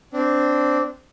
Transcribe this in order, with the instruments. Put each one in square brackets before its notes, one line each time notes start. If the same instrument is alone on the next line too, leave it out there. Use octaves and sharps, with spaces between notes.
[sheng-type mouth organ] C4 D4